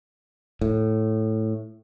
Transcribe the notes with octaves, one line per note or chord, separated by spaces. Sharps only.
A2